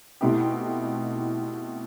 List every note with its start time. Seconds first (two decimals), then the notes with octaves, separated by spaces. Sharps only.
0.21 B2 A3 C4 E4 G4